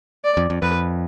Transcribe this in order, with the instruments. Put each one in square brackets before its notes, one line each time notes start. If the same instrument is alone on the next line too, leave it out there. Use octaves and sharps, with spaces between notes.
[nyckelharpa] D5
[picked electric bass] F2
F2
[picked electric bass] F2 [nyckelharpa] B4